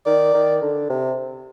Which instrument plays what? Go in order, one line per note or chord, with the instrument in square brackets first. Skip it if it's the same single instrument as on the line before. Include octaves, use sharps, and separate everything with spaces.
[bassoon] D#3 [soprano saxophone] D5
[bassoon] D#3
D3
C3